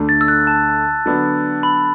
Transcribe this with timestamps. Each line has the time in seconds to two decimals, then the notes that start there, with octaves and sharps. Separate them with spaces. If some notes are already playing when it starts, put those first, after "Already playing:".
Already playing: D2 D3 A3 D4
0.09 A6
0.21 E6
0.28 F#6
0.47 A5
1.06 D3 F#3 B3 D4
1.63 B5